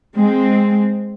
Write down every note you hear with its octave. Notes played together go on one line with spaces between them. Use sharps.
G#3 C4